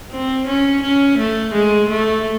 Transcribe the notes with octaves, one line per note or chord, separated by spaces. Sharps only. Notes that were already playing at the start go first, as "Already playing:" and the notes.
C4
C#4
C#4
A3
G#3
A3